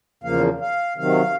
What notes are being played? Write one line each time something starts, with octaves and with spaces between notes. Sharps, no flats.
E2 C#3 F3 A#3 F5
F5
C3 D#3 F#3 F5